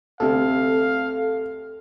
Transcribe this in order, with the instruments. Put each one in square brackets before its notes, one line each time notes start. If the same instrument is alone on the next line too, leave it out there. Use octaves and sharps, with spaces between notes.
[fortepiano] D2 C3 [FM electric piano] A4 [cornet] F5